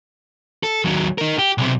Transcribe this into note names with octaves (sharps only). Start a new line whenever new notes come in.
A4
D#2 F#3
D#4 A#4
G4
B1 C3